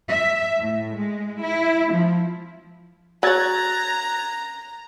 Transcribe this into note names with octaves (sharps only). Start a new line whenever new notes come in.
E5
A2
G#3
E4
F3
F#3 C#5 A#5 F#6 G#6 A6